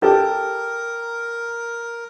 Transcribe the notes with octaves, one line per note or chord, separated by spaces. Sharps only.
G4 A4 A#4